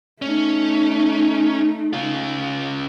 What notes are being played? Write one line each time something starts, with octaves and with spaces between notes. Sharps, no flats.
A3 C#4 D#4
C#3 F4